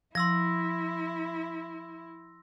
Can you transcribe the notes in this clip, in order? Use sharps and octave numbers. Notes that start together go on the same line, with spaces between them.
F3 E4 C6 E6 A#6